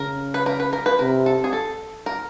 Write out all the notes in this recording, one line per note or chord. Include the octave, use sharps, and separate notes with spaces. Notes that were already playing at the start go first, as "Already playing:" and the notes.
Already playing: C#3 A#4
B4
A#4
B4
A#4
B4
C3 A#4
A4
G#4
A4
A#4